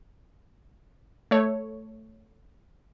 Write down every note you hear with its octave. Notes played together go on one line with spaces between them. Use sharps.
A3 C#5